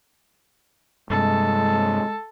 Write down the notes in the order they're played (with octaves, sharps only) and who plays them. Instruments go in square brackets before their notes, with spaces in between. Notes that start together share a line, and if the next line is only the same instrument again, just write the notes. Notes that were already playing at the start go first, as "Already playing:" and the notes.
[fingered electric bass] G2 C3 [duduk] G#3 [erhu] A4